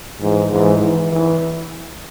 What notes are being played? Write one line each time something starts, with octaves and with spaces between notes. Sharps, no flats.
G#2 E3
G#2 E3
E3
E3